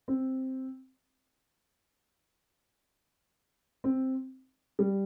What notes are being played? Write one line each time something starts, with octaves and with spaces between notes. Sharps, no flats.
C4
C4
G3